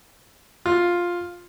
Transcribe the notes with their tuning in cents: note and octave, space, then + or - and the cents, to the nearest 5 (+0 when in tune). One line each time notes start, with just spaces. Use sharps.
F4 +5